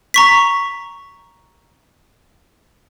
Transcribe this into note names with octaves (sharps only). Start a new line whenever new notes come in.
A#5 C#6 B6